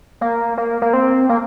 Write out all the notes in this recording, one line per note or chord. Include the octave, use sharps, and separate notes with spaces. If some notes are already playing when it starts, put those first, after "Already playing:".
A#3
A#3
A#3
C4
A#3